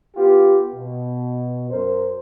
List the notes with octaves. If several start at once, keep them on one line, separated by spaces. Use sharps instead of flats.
B3 F4 G4
B2
F#2 A#4 C5